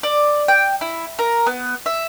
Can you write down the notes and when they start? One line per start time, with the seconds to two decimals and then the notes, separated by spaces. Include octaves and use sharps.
0.03 D5
0.48 G5
0.81 E4
1.19 A#4
1.47 B3
1.86 E5